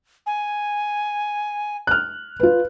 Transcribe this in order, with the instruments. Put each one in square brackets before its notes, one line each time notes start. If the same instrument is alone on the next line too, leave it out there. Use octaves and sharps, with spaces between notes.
[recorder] G#5
[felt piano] F6 F#6
F4 B4